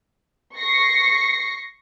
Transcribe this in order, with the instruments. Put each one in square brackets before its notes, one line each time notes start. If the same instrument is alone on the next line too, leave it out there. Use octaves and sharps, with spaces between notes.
[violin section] C#6 A#6 C7 C#7